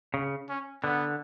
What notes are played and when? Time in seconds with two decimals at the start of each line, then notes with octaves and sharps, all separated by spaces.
0.14 C#3
0.49 C#4
0.84 D3 B3